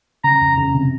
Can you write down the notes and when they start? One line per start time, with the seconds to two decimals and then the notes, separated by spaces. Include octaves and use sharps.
0.24 C#3 A#5
0.42 F2
0.58 C#3
0.75 C3